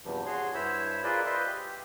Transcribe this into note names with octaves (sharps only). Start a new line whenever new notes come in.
E2 G2 C3 F3
F#4 G#4 C#5 C6
G2 E4 C5 C#5 B5 E6
F4 G#4 A#4 B4 D5 D#5
B4 C5 D#5 E5 C6
G4